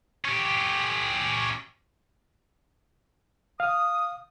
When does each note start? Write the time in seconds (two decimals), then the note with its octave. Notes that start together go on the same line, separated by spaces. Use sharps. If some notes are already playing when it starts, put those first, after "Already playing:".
0.25 C#4 G4
3.60 F5 D#6